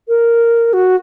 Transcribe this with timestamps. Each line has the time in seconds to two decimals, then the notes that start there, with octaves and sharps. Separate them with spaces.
0.08 A#4
0.73 F#4